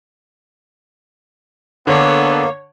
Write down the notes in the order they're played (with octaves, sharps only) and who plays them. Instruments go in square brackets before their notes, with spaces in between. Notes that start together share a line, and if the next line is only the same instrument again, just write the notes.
[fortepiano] D3 [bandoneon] A#3 [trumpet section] B3 D4 A4 [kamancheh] C#5